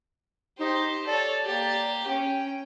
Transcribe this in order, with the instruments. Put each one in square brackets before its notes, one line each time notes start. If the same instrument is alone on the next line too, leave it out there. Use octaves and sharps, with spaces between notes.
[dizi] D#4 [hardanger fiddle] G4 C5
[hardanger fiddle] A4 C#5 [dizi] D5
[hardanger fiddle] A#3 G4
[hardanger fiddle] C#4 [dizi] G5